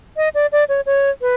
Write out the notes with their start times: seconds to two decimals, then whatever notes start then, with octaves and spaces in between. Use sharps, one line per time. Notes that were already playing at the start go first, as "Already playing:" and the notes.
0.17 D#5
0.34 D5
0.52 D5
0.69 C#5
0.86 C#5
1.21 B4